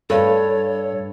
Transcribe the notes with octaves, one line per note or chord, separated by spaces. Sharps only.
G2 A4 C#5